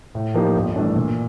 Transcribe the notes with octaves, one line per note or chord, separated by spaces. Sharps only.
A2
F3 A#3 D#4 G4
G1
G2 E3 A3 D4
A#2